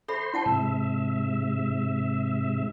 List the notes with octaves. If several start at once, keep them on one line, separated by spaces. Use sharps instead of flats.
A4 C5 E5 B5 C6
E4 F#5 A5
G#2 C3 E5